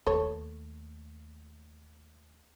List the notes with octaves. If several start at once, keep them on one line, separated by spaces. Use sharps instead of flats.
D#2 A3 A4 C#5